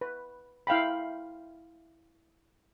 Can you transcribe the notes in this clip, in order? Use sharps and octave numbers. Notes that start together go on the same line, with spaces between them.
B4
E4 F5 G5 B5